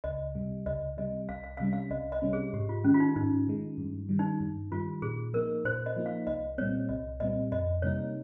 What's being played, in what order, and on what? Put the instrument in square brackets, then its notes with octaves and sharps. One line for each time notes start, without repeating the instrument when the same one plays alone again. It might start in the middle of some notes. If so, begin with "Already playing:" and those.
[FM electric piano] C#2 [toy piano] D#5
[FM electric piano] C3 G3
[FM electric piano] C#2 [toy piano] D#5
[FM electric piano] C3 G3 [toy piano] D#5
[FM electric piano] C2 [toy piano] F5
[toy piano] F5
F5
[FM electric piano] C3 G3 C#4
[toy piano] F5
[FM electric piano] C2 [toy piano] D#5
[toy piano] D#5
[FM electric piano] C3 G3 C#4
[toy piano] G#4
[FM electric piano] G#2 [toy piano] G4
[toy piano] F4
[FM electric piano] D#3 G#3 [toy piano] C#4
[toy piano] F4
D#4
[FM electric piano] G#2 [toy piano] D#4
[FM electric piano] D#3 G#3
G2
D#3 G3
[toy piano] D#4
[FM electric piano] G2
[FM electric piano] D#3 G3 [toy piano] F4
[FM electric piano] A#2 [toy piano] G#4
[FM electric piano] F3 A#3 D#4 [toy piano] A#4
[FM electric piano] A#2 [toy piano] C5
[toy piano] D#5
[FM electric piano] F3 A#3 D#4
[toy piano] F5
[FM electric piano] C2 [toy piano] D#5
[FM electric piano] A#2 G3 C4 [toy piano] C#5
[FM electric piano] C2 [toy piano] D#5
[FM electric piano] A#2 G3 C4 [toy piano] D#5
[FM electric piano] F2 [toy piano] D#5
[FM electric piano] C3 G3 A#3 D#4 [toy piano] C#5